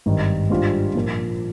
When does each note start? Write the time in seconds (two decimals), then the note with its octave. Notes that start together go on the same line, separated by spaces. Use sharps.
0.06 G#1 G2 D#3
0.50 G#2 G3 D4 F4
0.95 A#2 F3 A#3